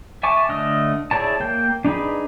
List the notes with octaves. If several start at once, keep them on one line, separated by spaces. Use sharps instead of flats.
E5 G#5 A5 C#6 D6
D3 A3 D#5 F6
E4 G#4 C#5 D5 A5
A#3 G5
D4 D#4 G#4 B4